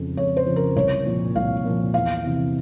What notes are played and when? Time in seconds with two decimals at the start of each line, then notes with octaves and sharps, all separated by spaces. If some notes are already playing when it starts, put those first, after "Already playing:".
Already playing: F2 C#3 F3
0.17 F2 C#5
0.37 C5
0.46 C#3 F3
0.56 A#4
0.76 C2 C#5
1.06 A#2 F3
1.35 C2 F5
1.64 A#2 F3
1.94 E2 F5
2.24 C3 E3